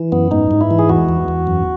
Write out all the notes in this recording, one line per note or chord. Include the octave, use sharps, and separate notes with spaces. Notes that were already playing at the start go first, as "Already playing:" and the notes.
Already playing: E3
F#2 B3
G#2 D#4
G#2
E4
E3
G#4
E2 F#4
E2
E2
F#2